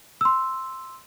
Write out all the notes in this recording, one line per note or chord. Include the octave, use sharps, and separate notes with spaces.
C6 E6